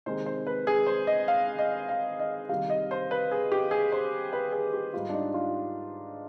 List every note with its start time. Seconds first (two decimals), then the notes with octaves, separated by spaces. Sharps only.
0.06 C3 D#3 G#3 C5
0.26 C5
0.47 B4
0.67 G#4
0.87 C5
1.07 D#5
1.28 F5
1.59 D#5
1.89 F5
2.19 D#5
2.49 C3 D#3 G3 F5
2.70 D#5
2.91 C5
3.11 B4
3.31 G#4
3.52 G4
3.71 G#4
3.92 C5
4.33 B4
4.52 G#4
4.73 G4
4.93 G#2 G3 F4
5.09 D4
5.13 D#4
5.34 F4